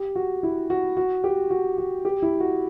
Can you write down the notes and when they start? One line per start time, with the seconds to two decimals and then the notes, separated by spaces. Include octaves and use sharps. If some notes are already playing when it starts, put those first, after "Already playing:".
Already playing: G4
0.15 F#4
0.43 E4
0.70 F#4
0.97 F#4
1.24 G4
1.50 F#4
1.78 F#4
2.05 G4
2.22 E4
2.40 F#4